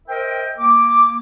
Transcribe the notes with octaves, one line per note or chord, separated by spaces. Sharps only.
A#4 C5 D#5 E5 G5
A#3 D6